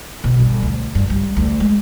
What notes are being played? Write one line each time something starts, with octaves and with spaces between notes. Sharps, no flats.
B2
G1
D2
G2
G3
D2
G#3